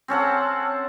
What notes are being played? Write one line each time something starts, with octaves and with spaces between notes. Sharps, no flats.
C4 C#4 A4 F#5